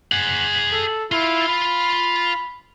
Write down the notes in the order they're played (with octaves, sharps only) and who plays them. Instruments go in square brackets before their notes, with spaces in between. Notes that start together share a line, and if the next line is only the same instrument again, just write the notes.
[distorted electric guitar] G#4 F#5
[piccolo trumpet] A4
[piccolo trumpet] E4 [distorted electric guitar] F4
[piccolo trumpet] B5